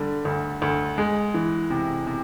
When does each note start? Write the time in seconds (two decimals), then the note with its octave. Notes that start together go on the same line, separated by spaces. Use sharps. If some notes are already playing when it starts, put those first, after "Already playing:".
Already playing: D3 G3
0.25 D2
0.62 D2
0.98 G#3
1.34 E3
1.70 C3
2.07 C3